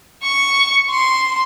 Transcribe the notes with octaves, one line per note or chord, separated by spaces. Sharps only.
C#6
C6